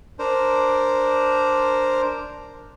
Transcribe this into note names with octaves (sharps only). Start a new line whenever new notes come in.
D4 A#4 C5